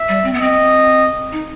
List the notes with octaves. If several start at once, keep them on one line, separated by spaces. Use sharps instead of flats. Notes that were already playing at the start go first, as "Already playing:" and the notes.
Already playing: E5
G3
C4
B3
C4 D#5
D#4